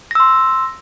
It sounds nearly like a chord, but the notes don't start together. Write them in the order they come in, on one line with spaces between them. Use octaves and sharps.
A#6 E6 C6